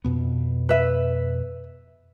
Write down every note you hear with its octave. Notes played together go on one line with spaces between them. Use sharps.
F2 B2 B3
B4 E5